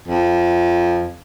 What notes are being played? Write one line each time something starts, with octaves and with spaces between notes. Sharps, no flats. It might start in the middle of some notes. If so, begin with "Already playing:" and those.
F2